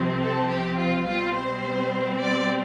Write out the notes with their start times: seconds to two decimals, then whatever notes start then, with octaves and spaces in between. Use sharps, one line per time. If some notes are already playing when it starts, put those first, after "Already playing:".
Already playing: C2 C3 F3 C4
0.22 A4
0.50 G4
0.78 F4
1.06 B2 G3 C4 F4
1.35 C5
2.20 D5